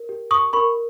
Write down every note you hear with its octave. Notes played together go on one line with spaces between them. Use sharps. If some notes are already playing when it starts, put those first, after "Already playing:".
Already playing: A#4
G4
C#6 D#6
A#4 B5 C#6